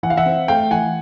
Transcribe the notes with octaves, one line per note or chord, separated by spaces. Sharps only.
E3 F#5
F5
E5 F#5
C4
A3 F5 G5
E3 F#5 G#5